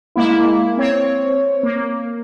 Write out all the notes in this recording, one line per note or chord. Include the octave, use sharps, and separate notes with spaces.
G#3 A#3 E4
C4 C#5
A#3